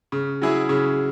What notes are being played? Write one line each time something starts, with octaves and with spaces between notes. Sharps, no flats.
C#3
F#3 E4 G#4
C#3